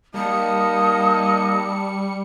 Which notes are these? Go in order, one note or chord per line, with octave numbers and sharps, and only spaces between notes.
G3 A#3 D#4 A5 D#6 C#7